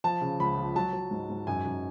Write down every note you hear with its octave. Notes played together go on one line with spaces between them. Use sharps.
F3 A5
C#3
C#2 B5
F3
F#3 A5
F#3
G#2
G#2
F#2 G#5
F#2